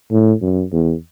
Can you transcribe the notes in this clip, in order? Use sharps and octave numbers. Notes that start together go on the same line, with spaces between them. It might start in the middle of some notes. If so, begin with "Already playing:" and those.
A2
F#2
E2